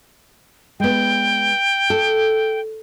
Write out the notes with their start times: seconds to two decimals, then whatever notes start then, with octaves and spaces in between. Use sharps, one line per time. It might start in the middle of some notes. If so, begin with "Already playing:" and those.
0.80 G#3 B3 G5
1.90 A4